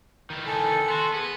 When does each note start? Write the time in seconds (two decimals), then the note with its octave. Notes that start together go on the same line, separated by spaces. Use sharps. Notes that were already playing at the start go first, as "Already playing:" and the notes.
0.30 D#3 E3
0.46 A4 G#5
0.88 B3 F#4 C6
1.14 B3 G#4 B4